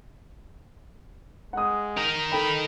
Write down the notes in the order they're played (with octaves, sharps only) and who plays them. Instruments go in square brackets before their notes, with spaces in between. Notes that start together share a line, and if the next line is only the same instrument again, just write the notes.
[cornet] G#3 [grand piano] F#5 D#6
[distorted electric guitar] D#4 A#4
[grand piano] A4 G5 [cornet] B5